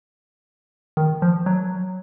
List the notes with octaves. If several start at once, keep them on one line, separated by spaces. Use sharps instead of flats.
D#3
F3
F#3